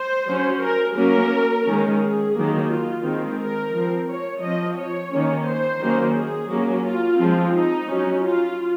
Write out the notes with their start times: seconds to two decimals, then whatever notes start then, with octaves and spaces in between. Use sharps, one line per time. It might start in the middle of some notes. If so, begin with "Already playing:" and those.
Already playing: C5
0.28 F#3 C#4
0.62 A#4
0.96 F#3 A#3 C#4 A#4
1.66 D#3 G#3 C#4
2.00 G#4
2.35 D#3 F#3 A#3
2.70 F4
3.04 D#3 G#3 C4
3.39 A#4
3.73 F3 C4
4.08 C#5
4.42 F3 C4 D#5
4.77 C#5
5.11 D#3 A#3 C#4
5.46 C5
5.80 D#3 F#3 A#3 C#4
6.14 G#4
6.49 F#3 A#3 C#4
6.84 F4
7.18 F3 G#3 C4
7.53 D#4
7.87 F#3 C#4
8.22 F4